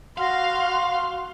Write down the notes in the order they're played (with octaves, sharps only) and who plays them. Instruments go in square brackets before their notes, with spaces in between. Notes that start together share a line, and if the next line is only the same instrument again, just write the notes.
[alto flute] F#4 [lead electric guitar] F5 [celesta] F#5 F6 A#6 [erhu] C6